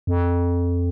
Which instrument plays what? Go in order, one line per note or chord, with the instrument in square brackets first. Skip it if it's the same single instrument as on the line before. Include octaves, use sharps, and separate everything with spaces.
[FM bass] F2